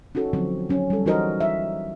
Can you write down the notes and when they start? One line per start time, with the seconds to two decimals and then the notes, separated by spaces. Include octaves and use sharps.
0.15 C#4 D#4 F#4 A4
0.33 D3 F3 F#3 C4
0.69 F#3 C#4
0.90 G3 A4
1.06 E3 D#4 F#4 A#4 C5 D#5
1.40 E5